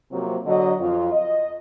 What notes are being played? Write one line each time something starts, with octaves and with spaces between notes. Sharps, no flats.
C3 F3 F#3 A#3 C4
D3 F#3 D#5
F2 F4
D#5